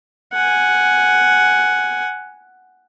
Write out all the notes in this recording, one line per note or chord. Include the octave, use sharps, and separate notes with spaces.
F#5 G#5